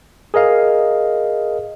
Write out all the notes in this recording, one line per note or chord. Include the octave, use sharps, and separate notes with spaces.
G#4 A#4 D#5 F5